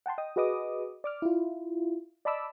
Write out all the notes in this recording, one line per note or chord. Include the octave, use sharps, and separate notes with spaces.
F#5 G5 A5 C6
D#5 G5 D#6
F#4 G#4 B4 D#5 D6 D#6
D5 D6 F6
E4 F4
D5 D#5 A5 B5 D6 E6